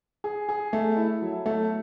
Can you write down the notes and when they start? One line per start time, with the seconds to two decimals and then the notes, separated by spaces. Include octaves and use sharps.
0.24 G#4
0.49 G#4
0.73 A3
0.97 E4
1.22 F#3
1.46 A3